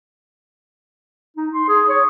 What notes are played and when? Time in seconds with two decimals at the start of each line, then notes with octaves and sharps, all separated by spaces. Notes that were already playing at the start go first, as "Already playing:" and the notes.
1.37 D#4
1.53 C6
1.68 G#4
1.89 C#5